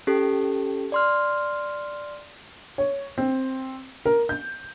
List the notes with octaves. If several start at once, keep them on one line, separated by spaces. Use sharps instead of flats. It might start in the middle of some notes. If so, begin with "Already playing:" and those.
C#4 G4 A4
D5 C6 F6
C#5
C4
A#4
G6